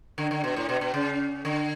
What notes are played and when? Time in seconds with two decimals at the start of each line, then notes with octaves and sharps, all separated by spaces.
0.18 D3
0.31 D3
0.44 B2
0.56 A2
0.69 B2
0.81 B2
0.94 C#3
1.45 D3